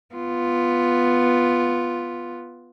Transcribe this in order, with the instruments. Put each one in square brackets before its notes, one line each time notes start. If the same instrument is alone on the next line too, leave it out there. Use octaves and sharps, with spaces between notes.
[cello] B3 F4